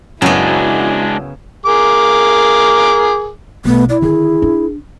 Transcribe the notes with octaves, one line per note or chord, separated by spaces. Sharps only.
F#2 C#3 G#3 B3 D4 E4 F#4
G#4 A#4 D6
B1 A3 B3
E4 D5
D3 D#3 G#4
D4